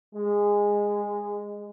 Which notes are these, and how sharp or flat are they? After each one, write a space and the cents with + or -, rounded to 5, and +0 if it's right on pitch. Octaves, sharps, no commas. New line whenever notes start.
G#3 -15